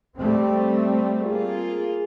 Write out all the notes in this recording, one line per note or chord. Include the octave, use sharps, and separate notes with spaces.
G3 A3 C4
A#3 F4 G#4